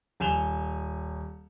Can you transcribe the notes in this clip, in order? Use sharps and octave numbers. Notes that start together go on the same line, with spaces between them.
D#1 G#5 E7 F7 G7